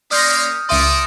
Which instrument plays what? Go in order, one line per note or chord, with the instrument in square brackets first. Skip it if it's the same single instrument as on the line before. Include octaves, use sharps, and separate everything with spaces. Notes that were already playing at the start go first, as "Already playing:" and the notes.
[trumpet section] A#3 C#4 [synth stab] D5 C6 A#6 [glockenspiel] D#6 F6 G6
[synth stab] C#2 E5 D#7 [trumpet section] A4 A#4 D5 [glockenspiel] C6 D#6